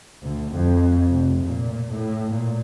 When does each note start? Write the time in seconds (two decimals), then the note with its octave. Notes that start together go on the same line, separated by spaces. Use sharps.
0.22 D2
0.55 F2
1.11 F1
1.43 A#2
1.91 A2
2.32 A#2